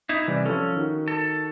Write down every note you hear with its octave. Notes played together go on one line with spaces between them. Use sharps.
D#4 E4
C3 E3 G3 D5
F3 C#4 A4
D#3 F#4
A4